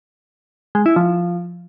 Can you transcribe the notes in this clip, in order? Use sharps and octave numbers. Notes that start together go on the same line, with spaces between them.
G#3
E4
F3